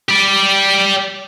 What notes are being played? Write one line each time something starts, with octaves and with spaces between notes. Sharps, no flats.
G4 D5